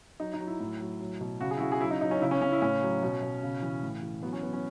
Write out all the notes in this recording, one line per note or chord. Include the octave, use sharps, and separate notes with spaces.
F#3 D#4
D#4
F#3
E4
A2
F#3
F#3
B2
C#3 F#4
G#4
E4
C#3 F#4
G#4
F#3 E4
D#4
F#3 D#4
C#4
C#3 E4
C#4
C#3 C#4
E4
A2 C#4
F#3
B2
B2
C#3
E3
A2
E3
F#3 B3
C#4
F#3 B3
C#4